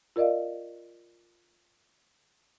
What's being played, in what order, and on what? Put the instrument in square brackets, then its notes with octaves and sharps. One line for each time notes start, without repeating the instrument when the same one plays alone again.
[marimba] F4 A#4 D5 D#5 F5